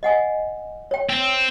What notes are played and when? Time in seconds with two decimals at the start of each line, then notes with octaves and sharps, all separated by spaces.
0.03 D#5 F#5 G#5
0.91 C#5 G5
1.09 C4